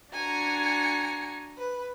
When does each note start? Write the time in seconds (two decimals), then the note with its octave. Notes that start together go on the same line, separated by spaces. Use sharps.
0.13 D4 F#4 G#5 A#5 C#7
1.58 B4